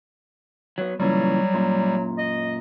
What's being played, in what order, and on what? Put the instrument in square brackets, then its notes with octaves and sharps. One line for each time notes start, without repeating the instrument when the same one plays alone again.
[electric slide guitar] F#3 B3
[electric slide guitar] A#2 C#3 E3 [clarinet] F#3 [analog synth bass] G3
[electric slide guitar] F#2 A#2
[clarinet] D#5